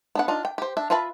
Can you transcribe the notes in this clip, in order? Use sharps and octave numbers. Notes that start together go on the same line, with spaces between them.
B3 D4 F#5
D4 D#4 F4
G5
G4 C5
D4 E5
F4 B4 E5 A5 B5